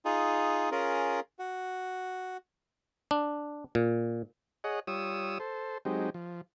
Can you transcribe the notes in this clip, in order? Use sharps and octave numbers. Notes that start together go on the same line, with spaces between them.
D#4 F4 G#4
C#4 F4 G#4 A#4
F#4
D4
A#2
G#4 C#5 D#5 F#5
G3 F4 C#5 D#6 E6
A4 C5
F#3 G#3 C4 D#4 G4
F3